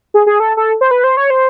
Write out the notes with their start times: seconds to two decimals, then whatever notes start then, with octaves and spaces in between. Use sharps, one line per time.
0.14 G#4
0.27 G#4
0.40 A4
0.57 A4
0.81 C5
0.91 B4
1.04 C5
1.17 C#5
1.30 C5